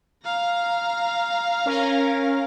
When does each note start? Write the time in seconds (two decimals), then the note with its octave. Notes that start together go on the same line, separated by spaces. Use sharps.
0.25 F5 A#5
1.66 C#4 A#4